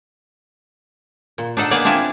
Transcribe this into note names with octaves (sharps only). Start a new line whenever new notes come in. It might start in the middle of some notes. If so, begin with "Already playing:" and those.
A#2
D4 D#4 A4 F#5
A#3 B3 D5 F5 F#5 G#5
C4 D4 E4 F4 G#5 A5